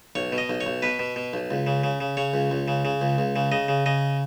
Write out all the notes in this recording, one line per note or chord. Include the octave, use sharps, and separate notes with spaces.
B1 C#5
B2
D#5
B1
C#5
B1
B2 B4
B2
B2
B1
C#2
C#3
C#3
C#3
C#3 C#5
C#2
C#2
C#3
C#3
C#2
C#2
C#3
C#3 D#5
C#3
C#3 D#5